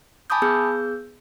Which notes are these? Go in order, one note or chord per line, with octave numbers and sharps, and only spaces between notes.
G#5 A5 B5 D6 D#6 G6
B3 G#4 E6 G6